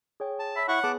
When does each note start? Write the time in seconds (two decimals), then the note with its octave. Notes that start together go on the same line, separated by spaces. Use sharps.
0.20 G#4 C#5 G5
0.39 A5
0.56 C#5 E5 B5
0.68 E4 F#5 C#6
0.84 B3 G#4 B4 A5 D6